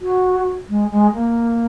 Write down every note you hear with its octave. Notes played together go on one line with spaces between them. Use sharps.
F#4
G#3
G#3
A#3